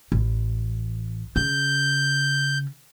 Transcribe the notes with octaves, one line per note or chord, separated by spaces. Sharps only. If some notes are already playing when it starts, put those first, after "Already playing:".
A1
C#3 G6